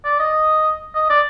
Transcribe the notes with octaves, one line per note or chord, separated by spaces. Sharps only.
D5
D#5
D#5
D5